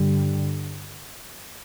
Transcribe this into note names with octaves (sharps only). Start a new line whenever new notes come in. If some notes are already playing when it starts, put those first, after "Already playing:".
Already playing: G2 D3 G3